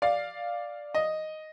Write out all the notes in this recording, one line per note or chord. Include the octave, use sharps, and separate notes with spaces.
D5 F5
D#5